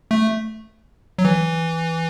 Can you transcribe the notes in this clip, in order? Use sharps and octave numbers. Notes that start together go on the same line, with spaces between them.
A3
F#3
E3